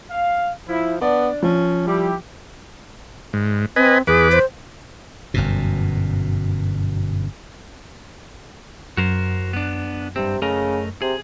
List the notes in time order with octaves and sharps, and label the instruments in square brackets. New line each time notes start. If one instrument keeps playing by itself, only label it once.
[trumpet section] F5
[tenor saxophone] F3 [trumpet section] E4
[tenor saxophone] B3 [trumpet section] D4 [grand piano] D5
[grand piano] F3 [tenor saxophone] C#4
[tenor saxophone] G3 [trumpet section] E4 G4
[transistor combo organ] G#2
[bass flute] C4 [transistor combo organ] B4 D#5 G#5
[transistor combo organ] E2 B4 D6 [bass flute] G#4
[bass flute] C5
[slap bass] G1 F#2 B2
[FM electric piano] F#2 [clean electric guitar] F#4 A#4 C5
[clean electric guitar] B3 D4
[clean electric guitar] G2 C4 [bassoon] C3
[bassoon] C#3 [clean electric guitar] A3 A#4 D#5
[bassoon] C3 [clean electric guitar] G#4